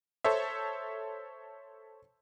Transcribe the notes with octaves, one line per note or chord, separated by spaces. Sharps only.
A4 C5 C#5 E5